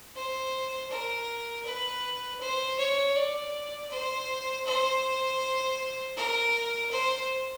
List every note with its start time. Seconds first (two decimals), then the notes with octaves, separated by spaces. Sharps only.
0.16 C5
0.91 A#4
1.66 B4
2.41 C5
2.79 C#5
3.15 D5
3.91 C5
4.66 C5
6.16 A#4
6.91 C5